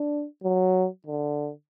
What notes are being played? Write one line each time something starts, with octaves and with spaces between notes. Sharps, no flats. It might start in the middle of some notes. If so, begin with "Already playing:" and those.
Already playing: D4
F#3
D3